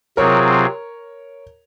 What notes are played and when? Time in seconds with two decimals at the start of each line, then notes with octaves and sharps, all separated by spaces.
0.17 C3 F#3 C4 F4 G#4 A#4 C#5